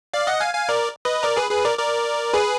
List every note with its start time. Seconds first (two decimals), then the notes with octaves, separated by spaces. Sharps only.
0.14 D5 F5
0.27 D#5 F#5
0.40 F5 G#5
0.54 F5 G#5
0.69 A#4 D5
1.05 B4 D#5
1.23 A#4 D5
1.37 G#4 B4
1.51 G#4 B4
1.65 A#4 D5
1.78 A#4 D5
2.34 G#4 B4